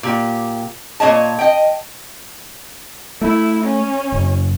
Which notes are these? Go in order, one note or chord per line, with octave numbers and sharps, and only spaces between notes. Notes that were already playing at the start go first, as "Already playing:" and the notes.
A#2 G4
A#2 D4 C#5 D#5 A5
D#5 G5
A3 E4
C#4
F#1